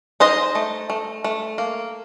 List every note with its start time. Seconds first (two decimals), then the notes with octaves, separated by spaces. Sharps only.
0.20 D#4 C5 D#5
0.55 A3
0.90 A3
1.24 A3
1.58 A#3